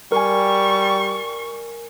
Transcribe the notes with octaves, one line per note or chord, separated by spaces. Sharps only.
G3 A#4 G#5 C#6